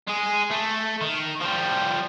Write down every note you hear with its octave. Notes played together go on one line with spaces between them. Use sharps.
G#3 G#4
A3
D#3
F3 G3